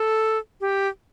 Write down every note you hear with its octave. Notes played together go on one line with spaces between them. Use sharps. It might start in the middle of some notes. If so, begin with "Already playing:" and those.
Already playing: A4
G4